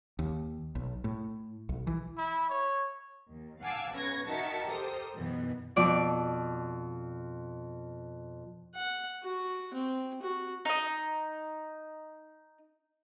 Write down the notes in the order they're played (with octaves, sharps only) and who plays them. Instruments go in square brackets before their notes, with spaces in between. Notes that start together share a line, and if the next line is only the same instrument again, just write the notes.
[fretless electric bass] D#2
B1
A2
B1
E3
[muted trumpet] E4
C#5
[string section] D#2
F5 F#5 G#5 A5 D6 E6
B1 C#4 B4 C#6 G#6 A#6
D#3 D#4 F#4 E5 A5 C#7
G4 A4 A#4 C5 D#6
F#2 B2 D#3 E3 B3
[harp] F2 B2 D5 D6
[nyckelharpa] F#5
F#4
C4
F#4
[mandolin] D#4 D#5